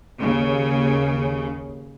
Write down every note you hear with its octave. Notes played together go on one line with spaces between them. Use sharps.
D#2 C#3